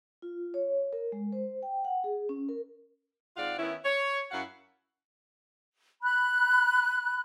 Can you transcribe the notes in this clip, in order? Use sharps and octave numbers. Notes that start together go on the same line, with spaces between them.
F4
C#5
A#4
G#3
C5
G5
F#5
G#4
C#4
A#4
G#2 C4 F4 D5 F5 F#5
D#3 B3 C#4 E4
C#5
F#2 E4 C#5 F5 F#5
B5 F#6